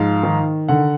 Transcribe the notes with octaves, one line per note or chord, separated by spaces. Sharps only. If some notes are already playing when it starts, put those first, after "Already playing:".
Already playing: G#2 F3 F5
D#3
D3 F#5